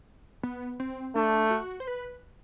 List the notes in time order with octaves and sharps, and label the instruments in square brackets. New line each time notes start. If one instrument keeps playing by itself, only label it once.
[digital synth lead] B3
C4
[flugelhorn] A3 [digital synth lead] D4
[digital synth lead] F#4
C5
B4